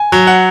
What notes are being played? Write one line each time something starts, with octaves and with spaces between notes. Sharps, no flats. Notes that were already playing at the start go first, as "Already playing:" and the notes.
Already playing: G#5
F#3
F#5